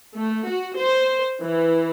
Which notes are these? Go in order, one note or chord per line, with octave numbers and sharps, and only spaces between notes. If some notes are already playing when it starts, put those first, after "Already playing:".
A3
F#4
C5
E3